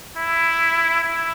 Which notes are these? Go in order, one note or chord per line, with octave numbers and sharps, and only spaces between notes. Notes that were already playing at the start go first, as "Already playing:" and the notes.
E4
E4